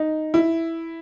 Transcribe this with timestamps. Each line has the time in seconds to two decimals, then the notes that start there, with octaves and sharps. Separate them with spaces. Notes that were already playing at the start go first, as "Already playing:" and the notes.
Already playing: D#4
0.34 E4